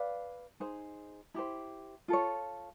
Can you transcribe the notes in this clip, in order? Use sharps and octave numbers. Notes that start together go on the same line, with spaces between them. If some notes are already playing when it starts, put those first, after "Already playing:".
Already playing: B4 D5 F5
D#4 G#4 C5
E4 G4 C5
F4 A4 C#5